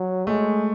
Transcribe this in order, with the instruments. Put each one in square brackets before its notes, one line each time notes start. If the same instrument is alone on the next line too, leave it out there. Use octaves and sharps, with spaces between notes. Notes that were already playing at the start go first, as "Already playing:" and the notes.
Already playing: [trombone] F#3
[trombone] G#3 [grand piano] A3